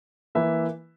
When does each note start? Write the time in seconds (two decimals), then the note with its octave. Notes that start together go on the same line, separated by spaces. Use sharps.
0.35 E3 A#3 E4 B4 E5